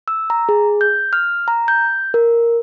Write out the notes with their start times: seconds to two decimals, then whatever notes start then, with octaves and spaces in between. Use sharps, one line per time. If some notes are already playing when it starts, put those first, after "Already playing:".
0.08 E6
0.30 A#5
0.49 G#4
0.81 G6
1.13 F6
1.48 A#5
1.68 G6
2.14 A#4